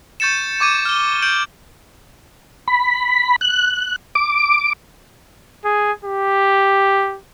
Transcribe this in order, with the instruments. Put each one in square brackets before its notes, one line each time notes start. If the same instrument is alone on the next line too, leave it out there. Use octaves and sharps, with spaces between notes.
[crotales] C#6 G6 A6 C#7 E7
C#6 D6 G#6 D#7
F6 G7
G6 D7 F#7
[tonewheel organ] B5
F#6
D6
[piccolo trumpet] G#4
G4